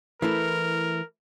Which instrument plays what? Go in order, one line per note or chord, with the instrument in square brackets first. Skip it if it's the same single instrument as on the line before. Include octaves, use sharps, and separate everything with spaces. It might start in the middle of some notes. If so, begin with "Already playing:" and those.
[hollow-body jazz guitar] E3 A3 E4 [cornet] A#4